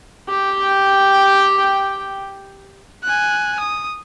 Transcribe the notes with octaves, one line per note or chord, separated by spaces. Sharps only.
G4 G5
G#5 F#6
D#6